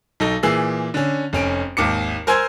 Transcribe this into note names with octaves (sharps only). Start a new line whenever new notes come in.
B1 D#4 A4 A#6
A#2 E3 G#4 E6 C7
D3 C#4
F1 C#4 D7
G#1 D#2 D6 C#7
A#4 C5 G#5 C6 E6 G#6